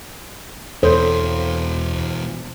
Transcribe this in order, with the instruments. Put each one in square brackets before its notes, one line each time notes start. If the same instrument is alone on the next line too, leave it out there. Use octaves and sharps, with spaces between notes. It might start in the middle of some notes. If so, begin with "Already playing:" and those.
[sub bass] E2 [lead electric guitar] B2 E3 [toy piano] A4 C#5 [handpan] C5